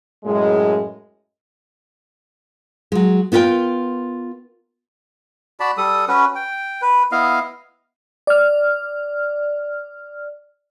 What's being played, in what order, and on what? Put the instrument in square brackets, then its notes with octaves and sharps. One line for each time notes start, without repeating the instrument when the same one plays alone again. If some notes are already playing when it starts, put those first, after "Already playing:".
[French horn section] F#2 A2 G#3
[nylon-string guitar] F#3 G#3
B3 E4 F4 A#4 G5
[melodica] F#4 D5 A5 B5
G3 A4 D#6
C#4 F#4 B4
G5
B4
B3 E4 D#5 F5
[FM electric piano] D5 F6